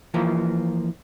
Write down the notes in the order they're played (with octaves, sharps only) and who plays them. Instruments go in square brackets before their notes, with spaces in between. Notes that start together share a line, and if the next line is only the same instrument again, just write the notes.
[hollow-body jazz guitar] E3 F3 A#3